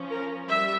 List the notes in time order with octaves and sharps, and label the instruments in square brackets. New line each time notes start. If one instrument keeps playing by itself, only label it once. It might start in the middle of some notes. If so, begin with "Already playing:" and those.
Already playing: [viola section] F3 C#4
A#4
G3 E5